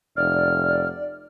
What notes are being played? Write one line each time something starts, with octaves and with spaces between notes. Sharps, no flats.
F1 D5 F6